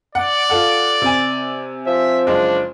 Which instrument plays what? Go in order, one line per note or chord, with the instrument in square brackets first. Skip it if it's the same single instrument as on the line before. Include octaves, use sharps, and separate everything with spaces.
[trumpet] D5 [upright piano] F#5
[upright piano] F4 A4 F#5
C3 G#5
[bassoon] F3 [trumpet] E5
[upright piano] F#1 G#3 [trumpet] D4